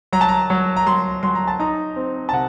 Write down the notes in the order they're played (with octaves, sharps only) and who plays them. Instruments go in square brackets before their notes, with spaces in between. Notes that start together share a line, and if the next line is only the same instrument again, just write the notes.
[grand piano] F#3 A#5
A5
A#5
F#3
A#5
F#3 C6
F#3 C6
A#5
A5
D#4 A#5
C4
A5
C3 F#5